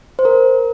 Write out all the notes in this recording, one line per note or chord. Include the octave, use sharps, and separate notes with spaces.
C5
A#4